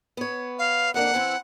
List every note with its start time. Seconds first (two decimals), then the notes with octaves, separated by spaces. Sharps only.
0.17 B3 C#5
0.59 F5
0.94 F2 A#3 D4 F#5
1.14 E3 C4 E4